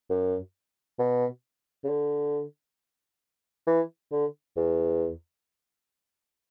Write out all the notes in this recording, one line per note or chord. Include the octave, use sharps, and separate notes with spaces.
F#2
B2
C#3
D3
E3
D3
E2